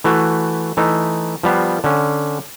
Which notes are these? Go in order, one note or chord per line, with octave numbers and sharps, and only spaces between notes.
E3 A3 F#4
E3 A3 D#4
F3 G3 B3 F5
D3 C#4